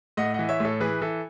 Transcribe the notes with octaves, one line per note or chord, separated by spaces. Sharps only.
A2 D#5 F#5
E3 D#5 F#5
C#5 E5
A2 A4 C#5
E3 G#4 B4
E3 A4